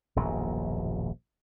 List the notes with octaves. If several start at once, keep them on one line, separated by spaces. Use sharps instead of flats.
D#1 A#1 F#2 B2